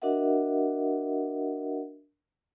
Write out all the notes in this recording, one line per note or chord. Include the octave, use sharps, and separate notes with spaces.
D4 F#4 A#4 D#5 E5 F#5